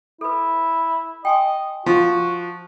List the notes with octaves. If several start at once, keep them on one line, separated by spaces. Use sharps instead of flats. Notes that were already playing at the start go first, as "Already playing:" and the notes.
E4 A4 B4
D#5 G5 G#5 C6
F3 F#4